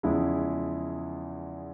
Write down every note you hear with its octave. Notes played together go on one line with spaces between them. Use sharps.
E2 C#3 F3 G#3 E4